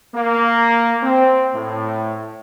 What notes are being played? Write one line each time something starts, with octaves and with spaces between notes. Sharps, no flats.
A#3
C4
A2